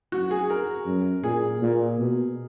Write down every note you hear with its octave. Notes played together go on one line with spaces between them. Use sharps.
F#2 F#4
G#4
A#4
F#2
A#2 G#4
A#2
B2